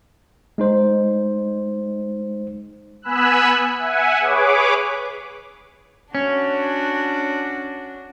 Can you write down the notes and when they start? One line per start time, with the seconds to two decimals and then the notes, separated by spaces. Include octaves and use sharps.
0.58 G#3 D#4 C5
3.02 B3 G#5 B5 E6 F#6
3.79 E5 F#5 G#5
4.20 G#4 B4 C#5 D6
6.15 C#4 D4 F#4